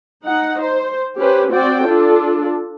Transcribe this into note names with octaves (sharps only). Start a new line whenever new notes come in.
D#4 F#5
C5
C#4 G4 B4 C5
C4 F#4 D5 G5
D4 F4 A4